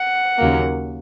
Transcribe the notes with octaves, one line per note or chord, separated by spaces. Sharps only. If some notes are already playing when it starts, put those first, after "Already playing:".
Already playing: F#5
D#2 C#3 F#3 A#3